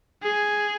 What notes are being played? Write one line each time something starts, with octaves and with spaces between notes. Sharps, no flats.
G#4